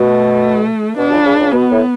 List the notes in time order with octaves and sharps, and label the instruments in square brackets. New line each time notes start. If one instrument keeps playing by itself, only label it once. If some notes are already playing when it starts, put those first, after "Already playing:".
Already playing: [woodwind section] B2 [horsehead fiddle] A3
[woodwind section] B2 [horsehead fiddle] D4
[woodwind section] C#2 C#3
C#2 C#3
C#2 C#3
[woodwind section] B2 [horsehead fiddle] B3
[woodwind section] A2